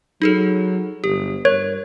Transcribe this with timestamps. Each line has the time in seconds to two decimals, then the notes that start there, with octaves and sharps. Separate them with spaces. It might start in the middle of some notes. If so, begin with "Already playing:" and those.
0.22 F#3 D#4 G#4 A4
1.04 G1 G4
1.45 G2 A#4 C#5